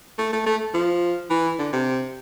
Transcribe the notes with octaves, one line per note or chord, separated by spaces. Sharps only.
A3
A3
A3
F3
E3
D3
C3